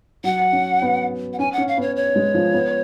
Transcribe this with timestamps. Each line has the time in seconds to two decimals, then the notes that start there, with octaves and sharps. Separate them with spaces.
0.24 F#3 F#5
0.52 C#4
0.82 B3
1.33 F#5
1.39 C#4 G#5
1.53 C#4 F#5
1.68 F5
1.78 B3
1.82 C#5
1.96 C#5
2.16 G#3
2.34 F3
2.54 B3